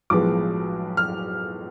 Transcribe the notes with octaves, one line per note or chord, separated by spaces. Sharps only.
B1 A2 F3 G#3 B3 D6
F6